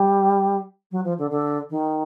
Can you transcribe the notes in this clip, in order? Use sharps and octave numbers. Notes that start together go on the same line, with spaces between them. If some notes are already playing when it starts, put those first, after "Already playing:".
Already playing: G3
F#3
F3
D3
D3
D#3